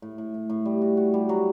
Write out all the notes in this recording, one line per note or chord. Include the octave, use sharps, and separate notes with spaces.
A2
A2
A2
A2
G3
F#4
F#4
G3
F#3